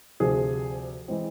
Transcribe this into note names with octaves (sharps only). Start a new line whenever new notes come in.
D2 C3 F3 G#4
E3 G#3 C4